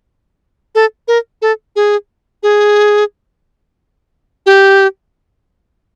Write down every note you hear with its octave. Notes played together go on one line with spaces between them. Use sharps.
A4
A#4
A4
G#4
G#4
G4